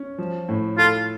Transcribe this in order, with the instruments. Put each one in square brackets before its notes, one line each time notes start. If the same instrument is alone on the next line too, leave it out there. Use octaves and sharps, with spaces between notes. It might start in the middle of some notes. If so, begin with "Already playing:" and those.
Already playing: [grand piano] C#4
F3
A2
[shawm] F4 [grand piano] A4